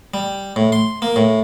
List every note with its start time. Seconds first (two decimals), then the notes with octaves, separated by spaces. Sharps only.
0.14 G3
0.56 A2
0.72 C6
1.02 A#3
1.16 A2